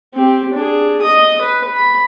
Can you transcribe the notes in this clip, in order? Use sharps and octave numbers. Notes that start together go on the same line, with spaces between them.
C4 G4
D4 G#4
D#5 D#6
B4
B5